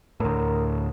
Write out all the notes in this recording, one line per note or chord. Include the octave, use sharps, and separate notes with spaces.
D2 A2 A#4